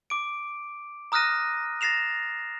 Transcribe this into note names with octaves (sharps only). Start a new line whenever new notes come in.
D6 D7
A#5 D#6 F6 F#6 A#6 D#7
A6 A#6 C7 E7 F7